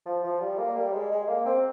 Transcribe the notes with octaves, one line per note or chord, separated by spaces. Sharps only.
F3
F3
G3
A#3
G3
G#3
G#3
A#3
C4